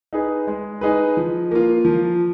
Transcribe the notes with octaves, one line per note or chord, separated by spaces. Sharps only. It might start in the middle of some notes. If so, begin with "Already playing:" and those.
D#4 G#4 B4
G#3
D#4 G#4 B4
F3
A#3 F4
F3